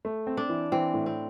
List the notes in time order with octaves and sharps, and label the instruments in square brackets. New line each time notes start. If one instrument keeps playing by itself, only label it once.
[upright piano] A3
C4
[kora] D4
[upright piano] E3
[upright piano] E3 [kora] C4
[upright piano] A2
[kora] C4